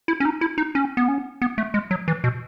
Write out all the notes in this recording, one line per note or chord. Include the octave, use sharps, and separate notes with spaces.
E4
C#4
D#4
E4
D#4
C#4
B3
C#4
B3
A3
G#3
F#3
E3
B2